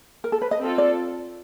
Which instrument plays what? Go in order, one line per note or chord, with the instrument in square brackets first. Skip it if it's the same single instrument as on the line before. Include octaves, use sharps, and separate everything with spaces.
[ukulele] A#4
A4
B4
D#5
[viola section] C4 F4 A4
[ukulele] D5